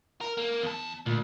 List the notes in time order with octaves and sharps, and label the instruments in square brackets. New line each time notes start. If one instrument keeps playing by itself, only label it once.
[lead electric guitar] A#4
A#3
E2 A5
[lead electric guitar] D2 [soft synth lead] A#2